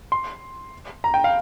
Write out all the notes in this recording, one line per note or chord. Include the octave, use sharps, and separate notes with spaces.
C6
A#5
G5
F5